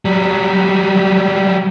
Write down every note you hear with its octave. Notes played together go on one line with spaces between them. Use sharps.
F#3 G3